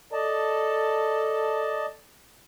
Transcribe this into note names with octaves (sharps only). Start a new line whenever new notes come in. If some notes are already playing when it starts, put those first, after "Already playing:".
A4 D5 D#5 A5